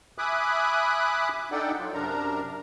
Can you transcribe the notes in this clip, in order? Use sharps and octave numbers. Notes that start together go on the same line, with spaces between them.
E5 G#5 B5 D6 D#6 F#6
D4 D#4 A4 D5 F#5 G5
F#3 F4
F#2 C3 D4 A#4 A#5